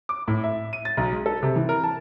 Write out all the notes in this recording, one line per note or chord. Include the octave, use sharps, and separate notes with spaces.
D6
A2
E5
D#7
A6
B1
G#3
A4
C3
E3
A#4
A5